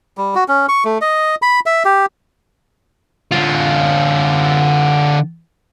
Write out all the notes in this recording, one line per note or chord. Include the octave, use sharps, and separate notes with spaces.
G3
F#4
C#4
C#6
A3
D#5
B5
E5
G4
D3 F4